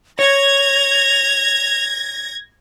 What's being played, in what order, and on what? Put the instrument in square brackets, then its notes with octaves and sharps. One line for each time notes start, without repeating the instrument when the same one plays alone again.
[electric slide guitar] C#5 [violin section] G#6 A#6 [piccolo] F7